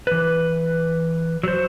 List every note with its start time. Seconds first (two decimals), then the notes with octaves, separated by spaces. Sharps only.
0.07 E3 B4
1.43 F#3 C5